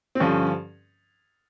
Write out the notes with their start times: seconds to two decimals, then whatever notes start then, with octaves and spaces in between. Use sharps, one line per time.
0.15 C4
0.20 G2 D3 F3 C#4